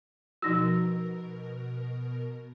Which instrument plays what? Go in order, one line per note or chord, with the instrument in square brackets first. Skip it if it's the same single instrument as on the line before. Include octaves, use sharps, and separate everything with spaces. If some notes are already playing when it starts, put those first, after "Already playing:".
[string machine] B2 A#4 [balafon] F3 D#4 F#4 [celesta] E6 A#6